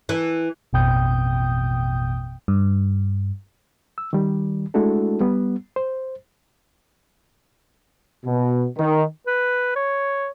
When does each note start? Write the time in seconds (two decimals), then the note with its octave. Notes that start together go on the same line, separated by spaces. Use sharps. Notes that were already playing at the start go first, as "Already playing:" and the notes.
0.09 E3
0.73 A1 F2 B2 G5 D#6 G6
2.48 G2
3.98 E6
4.13 D#3 G3
4.74 G#3 A3 D4 E4 F#4 A4
5.21 G3 B3
5.76 C5
8.25 B2
8.78 D#3
9.27 B4
9.76 C#5